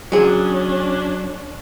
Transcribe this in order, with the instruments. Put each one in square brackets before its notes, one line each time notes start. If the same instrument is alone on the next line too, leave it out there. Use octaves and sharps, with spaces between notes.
[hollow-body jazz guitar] F#3 G#4 [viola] C#4 D4